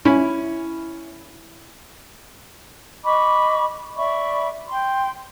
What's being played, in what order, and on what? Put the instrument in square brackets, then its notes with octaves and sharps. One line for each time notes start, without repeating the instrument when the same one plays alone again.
[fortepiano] C#4 [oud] E4
[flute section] D#5 B5 C#6 D6
D5 E5 B5 C#6
G5 C6